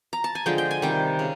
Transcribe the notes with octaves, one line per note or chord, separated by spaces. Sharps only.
A#5
A5
G#5
D3 F3 G#3 G5
G5
G#5
C3 D#3 G3 G5
C#3